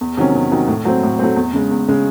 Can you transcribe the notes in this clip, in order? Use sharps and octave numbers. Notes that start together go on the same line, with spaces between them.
E2
C3 D#3 F#3 C#4
E2
C3 D#3 F#3 C#4
A2
F#3 A3 C4
A2
F#3 A3 C4
E2
C#3 G#3
E2
C#3 G#3